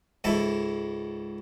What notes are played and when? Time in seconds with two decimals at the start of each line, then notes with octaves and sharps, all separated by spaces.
0.24 C#2 G#2 E4 A4 E5